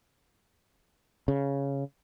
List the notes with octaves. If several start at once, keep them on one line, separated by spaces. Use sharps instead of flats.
C#3